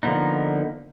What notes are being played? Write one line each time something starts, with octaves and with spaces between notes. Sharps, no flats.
D3 F3 A#3 B3 D#4